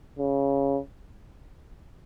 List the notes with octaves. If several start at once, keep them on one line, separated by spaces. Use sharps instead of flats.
C#3